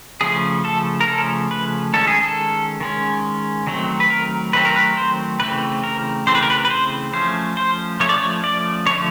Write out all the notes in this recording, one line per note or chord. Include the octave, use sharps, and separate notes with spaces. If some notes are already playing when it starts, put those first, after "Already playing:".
C#3 F3 A3 C#4 G#4
A4
A#4
C#3 F3 A3 C#4 A4
B4
D#3 G#3 C#4 A4
G#4
A4
D#3 G#3 C#4
D#3 F#3 A3 C4
B4
A#4
D#3 F#3 A3 C4 B4
A#4
B4
C5
C#3 E3 A3 C4 B4
A#4
C#3 E3 A3 C4 C5
B4
A#4
B4
B4
C5
F3 A3 C#4 C5
C5
F3 A3 C#4 C#5
D5
C#5
D5
D3 F3 A3 C#5